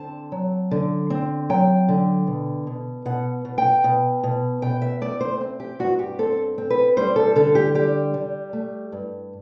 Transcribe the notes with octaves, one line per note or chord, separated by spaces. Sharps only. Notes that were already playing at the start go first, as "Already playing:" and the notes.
Already playing: D3 C4 A5
F#3
D3
C4
F#3 G5
D3
B2
B2
B2 F#5
B2
G5
B2
B2
B2 G5
E5
A3 D5
C5
C4
G4
G2 F#4
G4
C4 A4
C4
B4
G3 C5
A4
D3 A4
G4
G3 G4
G3
A3
G2